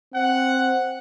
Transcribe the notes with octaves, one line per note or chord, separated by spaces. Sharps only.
C4 F#5